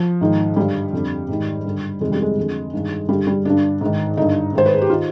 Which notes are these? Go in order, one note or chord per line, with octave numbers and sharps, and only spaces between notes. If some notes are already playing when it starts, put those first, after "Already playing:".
Already playing: F3
G#2 D#3
G2 D3 G3
F2 D3
G#2 D#3
G2 D3
F2 C3 D#3 G#3
G3
G#3
F2 D3
G2 D#3
G2 D3 G3
G3
G2 D3 D4
G#2 D#3
G2 D3 D#4
G#2 D#3 C5
B4
G#4
G4
D#3 F4